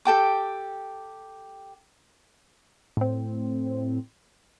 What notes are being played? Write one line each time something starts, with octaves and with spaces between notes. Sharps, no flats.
G4 A4 G5 D6
A2 C4